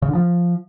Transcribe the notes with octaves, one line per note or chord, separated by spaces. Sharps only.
C#3
D3
F3